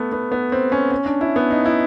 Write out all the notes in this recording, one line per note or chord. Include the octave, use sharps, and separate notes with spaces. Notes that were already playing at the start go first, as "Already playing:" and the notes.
Already playing: A3 B3
B3
B3
C4
C#4
C#4
D4
E4
B3
D#4
E4